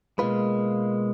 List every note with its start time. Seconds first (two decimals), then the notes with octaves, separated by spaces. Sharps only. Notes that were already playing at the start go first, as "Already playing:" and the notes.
0.18 B2 G#3 A#3 F4 B4